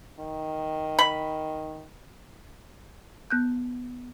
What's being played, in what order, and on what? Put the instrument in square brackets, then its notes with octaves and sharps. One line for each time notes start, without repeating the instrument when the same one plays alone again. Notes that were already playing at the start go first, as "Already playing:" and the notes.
[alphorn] D#3
[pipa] B5
[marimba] B3 F#6 G6